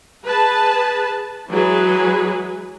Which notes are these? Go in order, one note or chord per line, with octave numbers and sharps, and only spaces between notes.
G#4 B4 A5
E3 F#3 G#3 G#4 B4